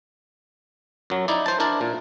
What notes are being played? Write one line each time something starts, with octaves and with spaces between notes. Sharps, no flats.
F#2 F#3
D#4 E4 D5
C5 A5
D4 E4 A#4 D5 A5
A#2